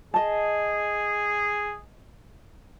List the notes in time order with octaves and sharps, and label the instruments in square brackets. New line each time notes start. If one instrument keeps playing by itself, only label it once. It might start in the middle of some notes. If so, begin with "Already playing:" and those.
[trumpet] G#4 [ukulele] D#5 A5